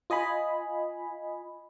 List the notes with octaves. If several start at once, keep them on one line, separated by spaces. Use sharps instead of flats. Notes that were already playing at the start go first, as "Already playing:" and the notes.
F4 D#5 G#5 B5